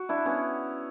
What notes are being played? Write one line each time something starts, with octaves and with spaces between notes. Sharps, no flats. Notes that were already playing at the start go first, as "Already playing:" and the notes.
Already playing: F#4
D4 E4
B3 C#4